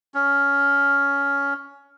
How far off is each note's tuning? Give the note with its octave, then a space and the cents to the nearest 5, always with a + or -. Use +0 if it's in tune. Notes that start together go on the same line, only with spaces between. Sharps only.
C#4 +15